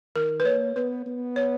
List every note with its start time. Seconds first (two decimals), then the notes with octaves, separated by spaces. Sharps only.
0.15 D#3 A#4
0.40 B4
0.45 A#3 C#5
0.76 B3 B4
1.06 B3
1.36 C#5